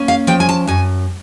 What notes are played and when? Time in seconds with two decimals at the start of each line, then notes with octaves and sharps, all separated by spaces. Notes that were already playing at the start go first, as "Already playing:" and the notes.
Already playing: A#3 C#4
0.08 F5
0.27 F3 G5
0.40 G#5
0.49 A5
0.67 F#2 G#5